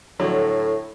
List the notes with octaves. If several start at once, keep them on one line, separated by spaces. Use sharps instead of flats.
A2 D3 F#3